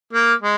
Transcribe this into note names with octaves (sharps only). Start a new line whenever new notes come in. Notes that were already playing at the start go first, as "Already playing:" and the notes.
A#3
G#3